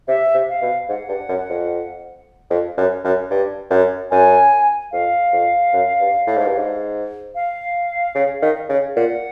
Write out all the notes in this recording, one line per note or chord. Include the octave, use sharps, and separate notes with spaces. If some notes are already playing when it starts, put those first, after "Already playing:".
C3 E5
C3
F5
B2
G#2 F#5
G2
F#2
F2
F2
F#2
F#2
G2
F#2
F#2 G#5
F2 F5
F2
F#2
G2
A2
G#2
G2
G#2
F5
C#3
D#3
C#3
A#2 F#5